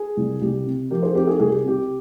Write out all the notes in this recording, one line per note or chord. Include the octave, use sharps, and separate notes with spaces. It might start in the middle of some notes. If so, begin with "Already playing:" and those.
Already playing: G#4
C2
C2 G4
C3
F3 G4 A#4
G#4 C5
C4 G4 A#4
G#4
C2 G#4
G4
C3 G4